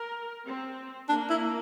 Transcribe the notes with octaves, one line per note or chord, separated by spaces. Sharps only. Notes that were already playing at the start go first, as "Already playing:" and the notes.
Already playing: A#4
C4
A#3 D4
E4